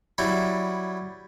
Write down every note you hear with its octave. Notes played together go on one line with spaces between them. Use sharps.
F#3 G3 E4